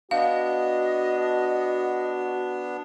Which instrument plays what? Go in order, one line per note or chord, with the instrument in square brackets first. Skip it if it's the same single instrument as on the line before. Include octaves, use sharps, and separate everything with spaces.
[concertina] B3 D4 [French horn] F#4 [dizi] D#5 [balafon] F5